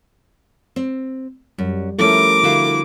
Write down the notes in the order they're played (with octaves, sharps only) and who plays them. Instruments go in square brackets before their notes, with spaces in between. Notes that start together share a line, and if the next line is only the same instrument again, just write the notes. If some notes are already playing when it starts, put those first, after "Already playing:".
[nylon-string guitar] C4
[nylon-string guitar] F#2 [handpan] G3
[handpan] F3 E4 A4 [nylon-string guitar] A3 C#4 [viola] A#4 D6
[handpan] D3 [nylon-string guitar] E4 F#4 F5